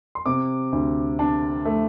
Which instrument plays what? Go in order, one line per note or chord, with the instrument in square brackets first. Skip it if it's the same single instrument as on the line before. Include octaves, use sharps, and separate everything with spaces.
[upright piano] C6
C3 D6
D2
D4 A5
A3